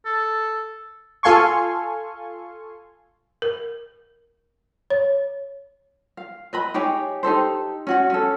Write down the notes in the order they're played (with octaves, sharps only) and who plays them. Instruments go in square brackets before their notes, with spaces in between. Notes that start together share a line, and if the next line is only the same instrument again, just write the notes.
[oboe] A4
[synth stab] F4 A4 F5 G#5 C6 C#6
[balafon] A#4
C#5
[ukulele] F5
B4 D#5 B5
D#4 G4 G#4 C#5
D#4 G4 A4 C5
C#4 F#4 F#5
C#4 A4